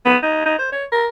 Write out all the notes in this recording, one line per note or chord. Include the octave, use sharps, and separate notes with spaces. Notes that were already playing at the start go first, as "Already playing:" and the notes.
B3
D#4
D#4
C5
C#5
A#4